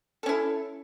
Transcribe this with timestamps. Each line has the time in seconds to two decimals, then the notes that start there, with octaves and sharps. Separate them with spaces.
0.23 A4
0.26 C#4
0.29 E4